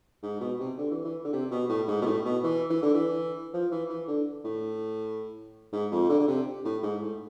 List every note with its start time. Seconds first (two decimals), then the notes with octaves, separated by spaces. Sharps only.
0.23 G#2
0.40 B2
0.59 C3
0.78 D3
0.91 E3
1.05 E3
1.24 D3
1.33 C3
1.51 B2
1.69 A2
1.88 G#2
2.02 B2
2.06 A2
2.25 B2
2.43 E3
2.70 E3
2.82 D3
2.94 E3
3.53 F3
3.71 E3
3.89 E3
4.08 D3
4.44 A2
5.72 G#2
5.91 F2
6.09 D3
6.19 D3
6.28 C3
6.65 A2
6.83 G#2
7.01 A2